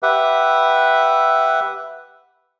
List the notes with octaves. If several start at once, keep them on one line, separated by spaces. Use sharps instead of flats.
G4 B4 E5 F#5